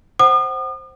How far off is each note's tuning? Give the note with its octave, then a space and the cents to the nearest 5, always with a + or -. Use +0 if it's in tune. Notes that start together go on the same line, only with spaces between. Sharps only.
C5 +10 F#5 +25 D#6 -40